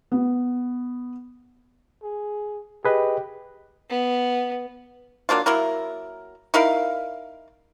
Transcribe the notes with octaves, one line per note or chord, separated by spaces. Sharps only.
B3
G#4
G4 G#4 B4 D#5
B3
F#3 A#3 D4 F4
F#3 A#3 E4 A#4
D#4 E4 A#4 F5